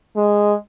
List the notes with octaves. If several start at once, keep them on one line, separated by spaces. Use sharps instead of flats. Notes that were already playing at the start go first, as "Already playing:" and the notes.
G#3